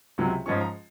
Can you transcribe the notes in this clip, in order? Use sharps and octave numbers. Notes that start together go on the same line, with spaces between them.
C#2 C3 F#3
G#2 F3 G#3 C#4 C#6
A#5